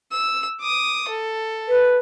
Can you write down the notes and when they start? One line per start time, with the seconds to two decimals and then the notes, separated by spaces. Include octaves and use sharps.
0.12 E6
0.60 D6 D#6
1.09 A4
1.68 B4